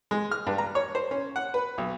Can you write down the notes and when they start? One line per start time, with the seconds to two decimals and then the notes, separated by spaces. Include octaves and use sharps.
0.11 G#3
0.31 F6
0.47 G2
0.58 A#5
0.75 C#5
0.95 C5
1.11 C#4
1.36 F#5
1.54 B4
1.78 B1